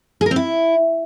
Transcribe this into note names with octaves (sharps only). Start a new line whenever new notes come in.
G#4
A#4
C4
E4